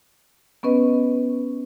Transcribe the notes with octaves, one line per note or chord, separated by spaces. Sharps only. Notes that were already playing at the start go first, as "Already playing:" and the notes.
B3 C#4 B4 D#5